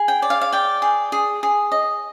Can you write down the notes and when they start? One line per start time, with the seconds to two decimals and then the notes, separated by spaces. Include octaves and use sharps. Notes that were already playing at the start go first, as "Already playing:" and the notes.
Already playing: G#4
0.08 G5
0.22 D5
0.30 F5
0.41 F5
0.52 D5 G5
0.82 G#4
1.12 G#4
1.43 G#4
1.72 D#5